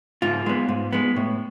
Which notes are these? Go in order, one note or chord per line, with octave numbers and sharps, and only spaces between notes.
G#2 F4
G#3 B3
G#2
G#3 B3
A2